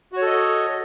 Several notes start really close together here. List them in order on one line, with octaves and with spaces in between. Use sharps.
F#4 C#5 A4 D#5